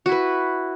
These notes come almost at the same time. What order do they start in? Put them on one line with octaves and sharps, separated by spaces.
F#4 E4 B4